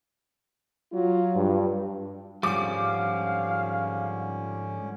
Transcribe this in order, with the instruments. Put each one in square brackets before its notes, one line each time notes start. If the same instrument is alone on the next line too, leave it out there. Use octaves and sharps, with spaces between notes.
[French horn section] F#3 F4
[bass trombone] G2
[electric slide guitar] G#2 F3 G3 [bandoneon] D3 C#4 [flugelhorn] F5 [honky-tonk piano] D6